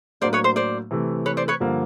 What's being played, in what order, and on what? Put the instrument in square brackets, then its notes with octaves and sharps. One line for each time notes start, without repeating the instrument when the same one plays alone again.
[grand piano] A2 F#3 A#3 D4 [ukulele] C5 D5
[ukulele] B4 C#5
C5
C5 D5
[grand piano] C3 E3 A3
[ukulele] B4 C#5
C5 D5
B4 C#5
[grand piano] G2 D3 F3 A#3